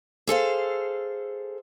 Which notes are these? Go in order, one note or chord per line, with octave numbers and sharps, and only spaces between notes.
G#4 A4 C5 F5